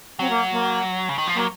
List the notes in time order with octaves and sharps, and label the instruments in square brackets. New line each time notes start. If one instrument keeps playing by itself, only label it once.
[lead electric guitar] F#3 [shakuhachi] C4
[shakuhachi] A#3
A#3
[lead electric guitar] C#3
D#3
F3
[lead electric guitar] F#3 [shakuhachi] A#3